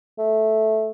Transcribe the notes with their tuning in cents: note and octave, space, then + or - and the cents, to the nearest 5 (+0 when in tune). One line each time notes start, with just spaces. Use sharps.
A3 -10